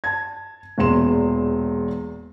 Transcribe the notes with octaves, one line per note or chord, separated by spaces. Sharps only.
A5 G#6
E1 E2 A#2 C6 E7